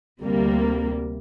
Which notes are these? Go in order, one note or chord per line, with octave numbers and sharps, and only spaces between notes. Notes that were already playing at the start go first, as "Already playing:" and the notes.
D2 C3 G3 A#3